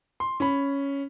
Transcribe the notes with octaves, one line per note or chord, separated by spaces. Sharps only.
C6
C#4 B5